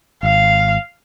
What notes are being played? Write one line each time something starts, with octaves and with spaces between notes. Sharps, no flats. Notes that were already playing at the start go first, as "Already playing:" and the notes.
G#1 F5